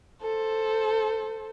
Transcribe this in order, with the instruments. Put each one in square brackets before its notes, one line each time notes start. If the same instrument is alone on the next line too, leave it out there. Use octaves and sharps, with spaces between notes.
[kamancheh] A4 C5